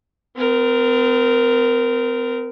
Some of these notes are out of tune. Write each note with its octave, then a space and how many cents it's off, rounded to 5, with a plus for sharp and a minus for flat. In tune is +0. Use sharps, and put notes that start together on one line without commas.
C4 -40 A#4 +0